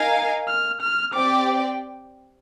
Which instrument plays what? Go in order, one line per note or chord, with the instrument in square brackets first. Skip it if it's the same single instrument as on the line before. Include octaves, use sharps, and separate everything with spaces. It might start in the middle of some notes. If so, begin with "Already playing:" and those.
Already playing: [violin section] D#4 A#4 F5 [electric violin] G#5
[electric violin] F6
F6
[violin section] C4 G4 D5 G5 [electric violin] D6